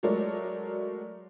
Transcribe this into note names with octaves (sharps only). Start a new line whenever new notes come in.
F#3 G#3 A3 A#4 C#5 D5